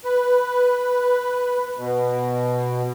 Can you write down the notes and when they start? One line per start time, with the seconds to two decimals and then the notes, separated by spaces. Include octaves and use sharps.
0.05 B4
1.77 B2